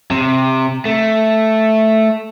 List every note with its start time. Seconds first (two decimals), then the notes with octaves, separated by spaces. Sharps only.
0.11 C3
0.85 A3